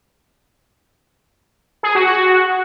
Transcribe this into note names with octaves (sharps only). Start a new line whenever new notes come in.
G#4
F#4
F#4